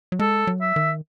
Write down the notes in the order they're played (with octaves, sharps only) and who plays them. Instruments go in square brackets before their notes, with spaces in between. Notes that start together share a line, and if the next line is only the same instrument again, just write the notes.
[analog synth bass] F#3
[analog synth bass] G#3 [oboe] A4
[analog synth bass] F#3
[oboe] E5
[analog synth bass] D#3